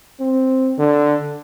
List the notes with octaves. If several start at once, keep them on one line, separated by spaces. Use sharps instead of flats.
C4
D3